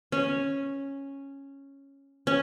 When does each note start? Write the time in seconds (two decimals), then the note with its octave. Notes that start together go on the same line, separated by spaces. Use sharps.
0.12 C#4
2.27 C#4